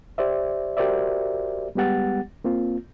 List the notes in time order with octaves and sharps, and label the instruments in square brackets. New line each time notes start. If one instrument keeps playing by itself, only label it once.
[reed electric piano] G4 C5 D5 E5
F#4 G4 A#4 C5 D5 E5
G3 G#3 B3 G4 F#5 A6
A#3 C4 F4